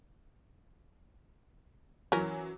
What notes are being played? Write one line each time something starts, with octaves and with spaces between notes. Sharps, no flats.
E3 F#3 C#4 A#4